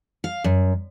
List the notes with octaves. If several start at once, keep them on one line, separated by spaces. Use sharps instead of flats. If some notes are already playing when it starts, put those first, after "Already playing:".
F5
F#2